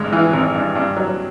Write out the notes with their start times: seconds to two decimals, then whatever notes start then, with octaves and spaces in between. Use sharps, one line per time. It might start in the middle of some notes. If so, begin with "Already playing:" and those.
Already playing: G#1 G2 G#3
0.12 E3
0.33 G#1
0.55 G2
0.75 G2
0.97 F#3